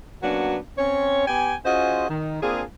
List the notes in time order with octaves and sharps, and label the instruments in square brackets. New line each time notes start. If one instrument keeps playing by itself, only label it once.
[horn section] F#3 A#3 B3 C#4 D4 F#4
C4 C#4 C#5
B3 G4 G5 G#5
C#4 F4 F#4 G#4 C5 D#5
D#3
A#3 C4 D4 F4 G#4